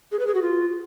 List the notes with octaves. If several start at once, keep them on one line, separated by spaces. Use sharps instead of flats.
G#4
B4
G#4
F#4
F4